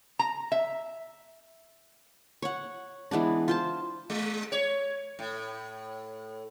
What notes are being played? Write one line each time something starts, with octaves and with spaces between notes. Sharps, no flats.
A#5
E5
C#5 F#5
E3 G#3 B3 D4
F4 C5 A5
G#3
C#5
A2